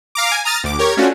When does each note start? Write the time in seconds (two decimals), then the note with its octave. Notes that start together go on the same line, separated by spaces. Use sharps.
0.15 F5 A#5 D6
0.31 G#5
0.45 A#5 D#6 F6 A6
0.64 D2 D6
0.79 G4 A#4 C#5 G#6
0.97 A3 C#4 D4 F4 F#4